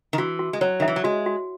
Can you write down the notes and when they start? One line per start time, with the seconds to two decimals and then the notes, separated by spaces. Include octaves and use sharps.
0.13 D#3
0.18 E3 F#4
0.39 F#4
0.53 G#3
0.61 F#3 C#5
0.80 D#3
0.82 E5
0.88 E3
0.96 F#3
1.04 G#3 F#4
1.26 F#4